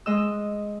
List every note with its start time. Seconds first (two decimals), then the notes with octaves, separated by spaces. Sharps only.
0.06 G#3 D#5 E6